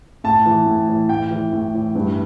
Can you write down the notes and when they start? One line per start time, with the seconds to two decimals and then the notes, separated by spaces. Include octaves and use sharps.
0.24 A2 A5
0.46 E3
0.66 A2
0.88 E3
1.09 A2 G5
1.31 E3
1.53 A2
1.74 E3
1.95 G2